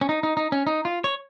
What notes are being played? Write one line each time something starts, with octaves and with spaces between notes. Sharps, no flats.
C#4
D#4
D#4
D#4
C#4
D#4
F4
C#5